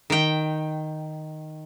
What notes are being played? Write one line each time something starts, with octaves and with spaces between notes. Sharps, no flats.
D#3 G5